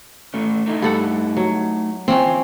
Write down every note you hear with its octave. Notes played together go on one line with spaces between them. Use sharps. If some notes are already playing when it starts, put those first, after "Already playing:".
A2 A3 C#4
A3 D#4 E4
G2 A4 F#5
F#3
E3 C4 C#4 F4